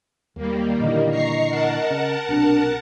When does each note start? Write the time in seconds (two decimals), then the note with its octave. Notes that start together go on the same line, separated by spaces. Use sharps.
0.36 D#2 D#3 G3 A#3
0.80 A#2 D3 E3 D#5
1.10 A#5 C#6 C7
1.49 A#4 F#5 A5
1.90 C#3
2.29 B1 C3 D4